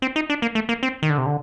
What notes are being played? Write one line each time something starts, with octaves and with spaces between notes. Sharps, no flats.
C4
D#4
D4
A#3
A3
A#3
C4
D#3
D3
C3
D3